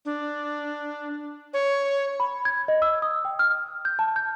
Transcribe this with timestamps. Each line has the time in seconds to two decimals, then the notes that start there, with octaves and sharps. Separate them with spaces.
0.05 D4
1.54 C#5
2.20 B5
2.45 G#6
2.68 D#5
2.82 E6
3.02 D#6
3.25 G5
3.39 F6
3.85 G6
3.99 A5
4.16 G6